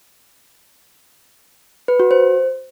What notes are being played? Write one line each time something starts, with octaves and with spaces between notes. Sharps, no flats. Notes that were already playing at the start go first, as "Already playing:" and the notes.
B4
F#4
C5